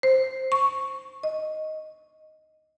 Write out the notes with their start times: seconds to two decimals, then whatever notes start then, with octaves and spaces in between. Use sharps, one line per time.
0.03 C5
0.52 C#6
1.23 D#5